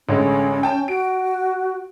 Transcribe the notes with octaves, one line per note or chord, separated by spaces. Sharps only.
A1 D3 G#3 C#4
G5 A5
F#4 D7